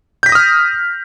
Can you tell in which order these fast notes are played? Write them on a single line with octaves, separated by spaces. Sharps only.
G6 B6 A#6 D#6 F6